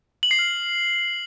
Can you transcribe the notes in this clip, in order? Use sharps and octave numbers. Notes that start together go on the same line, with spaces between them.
F#7
C7
F6